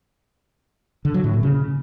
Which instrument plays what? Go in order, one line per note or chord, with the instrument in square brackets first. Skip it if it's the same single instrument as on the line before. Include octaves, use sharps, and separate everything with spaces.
[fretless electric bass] D3
F#3
A2
A#2
C#3